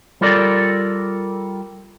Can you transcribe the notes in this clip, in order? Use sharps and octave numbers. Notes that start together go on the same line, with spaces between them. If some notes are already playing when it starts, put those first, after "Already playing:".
G3 F4 A4 A#4 D5